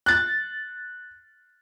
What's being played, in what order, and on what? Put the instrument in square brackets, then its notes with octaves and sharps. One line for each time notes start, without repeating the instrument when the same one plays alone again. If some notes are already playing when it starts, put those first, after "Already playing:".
[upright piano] F#6 A6